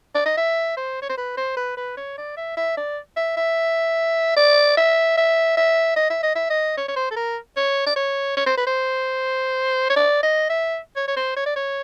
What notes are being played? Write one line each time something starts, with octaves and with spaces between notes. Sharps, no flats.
D5
D#5
E5
C5
C#5
C5
B4
C5
B4
B4
C#5
D5
E5
E5
D5
E5
E5
D5
E5
E5
E5
D#5
E5
D#5
E5
D#5
C#5
C#5
C5
A4
A#4
C#5
D5
C#5
C#5
C5
B4
C5
C#5
D5
D#5
E5
C#5
C#5
C5
C#5
D5
C#5